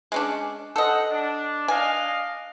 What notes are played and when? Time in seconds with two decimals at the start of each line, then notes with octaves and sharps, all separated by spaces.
0.12 G#3 C#4 D4
0.76 A4 C5 D#5 F#5
1.11 D4
1.68 D4 D#5 F5 G#5